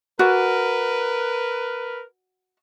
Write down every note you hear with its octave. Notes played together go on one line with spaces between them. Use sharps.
F#4 A#4 B4 D5